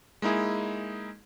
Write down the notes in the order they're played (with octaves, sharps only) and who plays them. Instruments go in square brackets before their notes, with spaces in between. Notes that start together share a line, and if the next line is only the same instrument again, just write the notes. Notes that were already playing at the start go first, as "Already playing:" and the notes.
[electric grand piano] G#3 A#3 D#4 E4 G#4